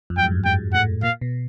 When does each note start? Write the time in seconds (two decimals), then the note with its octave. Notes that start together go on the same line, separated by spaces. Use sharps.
0.10 F2
0.17 F#2 G5
0.24 G#2
0.31 G2
0.45 G#2 G5
0.73 A2 F#5
1.03 A#2 F5
1.21 B2